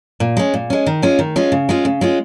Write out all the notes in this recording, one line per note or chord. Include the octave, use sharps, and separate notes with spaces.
A#2
G#3 C#4
A#2
G#3 C#4
D#3
G#3 C#4 F4
D#3
G#3 C#4 F4
C#3
G#3 C#4 F4
C#3
G#3 C#4 F4